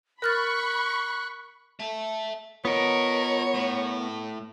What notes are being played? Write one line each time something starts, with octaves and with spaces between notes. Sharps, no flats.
A#4 B5 C#6 F6 F#6 A6
E5 A5
B3 F4 A#4 C#5 D#5
A2